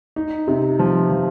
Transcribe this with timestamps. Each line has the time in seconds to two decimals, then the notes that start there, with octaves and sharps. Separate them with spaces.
0.16 D#4
0.48 C3
0.79 F3
1.10 F3